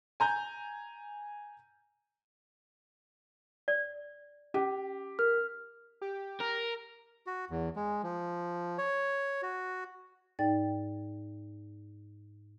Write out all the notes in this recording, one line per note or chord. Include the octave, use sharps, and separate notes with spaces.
G#5 A#5 G6
D5
C#4 G4
A#4 F6
G4
A#4
F#4
E2
G#3
F3
C#5
F#4
G#2 D#4 D5 G5 A6